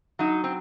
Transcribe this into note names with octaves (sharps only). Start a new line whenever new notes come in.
F#3 D#4
C4